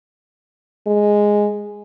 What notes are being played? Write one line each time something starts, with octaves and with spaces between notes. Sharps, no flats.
G#3